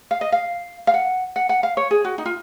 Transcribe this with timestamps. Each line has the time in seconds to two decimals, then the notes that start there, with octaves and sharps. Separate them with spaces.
0.11 F5
0.21 D#5
0.32 F5
0.87 F5
0.94 F#5
1.36 F#5
1.49 F#5
1.63 F5
1.77 C#5
1.91 G#4
2.05 F#4
2.18 D#4
2.26 F4